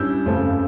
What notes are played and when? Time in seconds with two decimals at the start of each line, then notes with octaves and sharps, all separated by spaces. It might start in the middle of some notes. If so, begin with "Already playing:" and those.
Already playing: G2 C#4 E4 E6 G6
0.26 F2 C#3 F3 A3